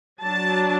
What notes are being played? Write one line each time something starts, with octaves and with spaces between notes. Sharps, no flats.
F#3 D4 A5